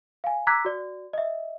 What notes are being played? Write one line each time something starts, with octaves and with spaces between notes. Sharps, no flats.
F5 G#5
A#5 D6 E6 F#6 G#6 B6
F#4 D5
D#5 E5